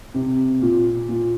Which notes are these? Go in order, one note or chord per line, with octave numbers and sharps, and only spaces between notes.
C3
A#2
A#2